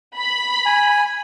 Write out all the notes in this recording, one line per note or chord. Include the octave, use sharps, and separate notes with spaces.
B5
G#5